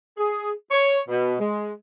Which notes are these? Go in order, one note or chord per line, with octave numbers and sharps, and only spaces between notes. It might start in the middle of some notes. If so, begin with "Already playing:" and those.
G#4
C#5
B2
G#3